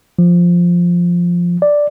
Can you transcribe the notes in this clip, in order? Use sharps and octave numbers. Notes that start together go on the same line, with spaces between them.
F3
D5